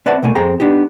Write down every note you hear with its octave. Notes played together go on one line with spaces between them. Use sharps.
C4 B4 D5 E5 F#5 A5
C2 B2 A3 A#3 G#5
F2 C4 G#4 G5 A#5
B3 D4 D#4 G4